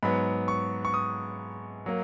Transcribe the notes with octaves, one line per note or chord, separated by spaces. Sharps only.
G#2 F#3 B3 B5
C#6
C#6
D#6
F#3 A#3